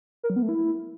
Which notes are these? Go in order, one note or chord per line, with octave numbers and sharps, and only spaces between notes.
A#4
F#3
B3
A3
E4